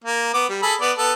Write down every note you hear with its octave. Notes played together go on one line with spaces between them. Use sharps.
A#3
B3 D6
G3
G#4 A4 B5
B3 D5
B3 A4